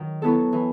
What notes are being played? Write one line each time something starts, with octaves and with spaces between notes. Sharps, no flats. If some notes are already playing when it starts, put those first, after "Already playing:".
Already playing: D#3 F#3 F#4
F#3 B3 E4 A4
E3